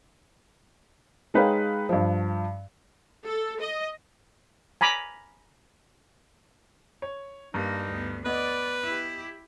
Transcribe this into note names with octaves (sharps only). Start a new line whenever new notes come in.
G#3 D#4 B4 C#5 F5 G5
G2 F3
A4
D#5
G#5 A#5 B5 D6
C#5
G2 A#3 D#4
D2 B3
B3 B4 D5 D#5
E4 G4